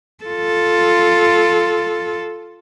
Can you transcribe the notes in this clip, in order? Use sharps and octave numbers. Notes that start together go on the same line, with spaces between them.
F4 A4